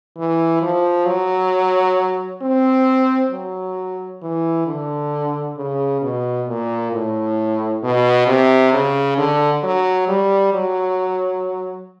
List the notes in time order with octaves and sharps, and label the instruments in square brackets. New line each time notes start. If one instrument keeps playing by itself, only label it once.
[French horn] E3
F3
F#3
C4
F#3
E3
D3
C#3
B2
A#2
A2
B2
C3
C#3
D3
F#3
G3
F#3